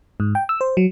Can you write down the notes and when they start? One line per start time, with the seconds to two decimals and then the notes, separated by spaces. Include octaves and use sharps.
0.20 G#2
0.35 G5
0.49 E6
0.61 C5
0.77 F#3